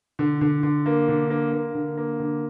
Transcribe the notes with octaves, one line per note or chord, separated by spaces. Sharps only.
D3
D3
D3
A#3
D3
A#3
A#3
D3
A#3
D3